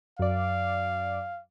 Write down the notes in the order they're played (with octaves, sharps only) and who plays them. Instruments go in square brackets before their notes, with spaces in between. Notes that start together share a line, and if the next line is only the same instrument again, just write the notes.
[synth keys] F#2 D5 [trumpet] F5